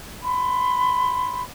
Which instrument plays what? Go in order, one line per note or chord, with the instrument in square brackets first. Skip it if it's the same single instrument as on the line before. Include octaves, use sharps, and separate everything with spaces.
[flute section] B5 C6